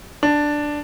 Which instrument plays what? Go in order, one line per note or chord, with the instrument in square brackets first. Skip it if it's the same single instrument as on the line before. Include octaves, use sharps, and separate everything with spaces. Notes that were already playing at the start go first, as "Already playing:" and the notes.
[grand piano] D4